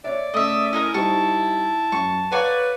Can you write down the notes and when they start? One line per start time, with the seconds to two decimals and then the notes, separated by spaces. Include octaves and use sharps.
0.04 C#5 D5 E5
0.34 C#3 A3 D#5 E5 D#6
0.73 C#4 D#4 E4 A#4
0.94 G3 D#4 C5 A5 C#6
1.92 F#2 C#6
2.32 B4 C#5 D5 F5 F#5 A#5